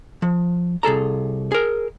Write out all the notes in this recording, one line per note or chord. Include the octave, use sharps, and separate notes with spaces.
F3
C2 G#4 A4 A#5
G#4 A#4